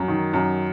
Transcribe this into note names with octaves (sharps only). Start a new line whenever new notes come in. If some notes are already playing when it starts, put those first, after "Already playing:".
Already playing: F#2
D#3
F#2